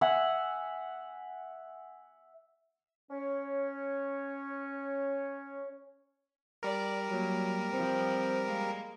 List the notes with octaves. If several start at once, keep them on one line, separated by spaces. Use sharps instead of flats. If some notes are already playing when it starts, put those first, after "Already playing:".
E5 F#5 G#5
C#4 C#5
G3 A#4 D5
F#3 A#3
F3 C4
G#3 A#3